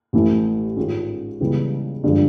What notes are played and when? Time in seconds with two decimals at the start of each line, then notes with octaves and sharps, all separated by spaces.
0.13 A1 A2 E3 A3
0.77 G#2 D#3 G#3 C#4 F4
1.40 C#2 C#3 E3 G3 B3
2.04 G2 D3 F3 G#3